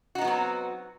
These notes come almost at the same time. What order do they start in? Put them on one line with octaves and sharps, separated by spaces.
F#4 D#4 B3 F#3 C4